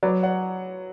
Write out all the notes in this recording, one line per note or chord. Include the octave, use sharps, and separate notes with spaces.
F#3 B4 D5
D5 F#5